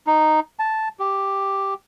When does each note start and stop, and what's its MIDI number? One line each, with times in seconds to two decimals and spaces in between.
0.07 0.40 63
0.59 0.88 81
0.99 1.74 67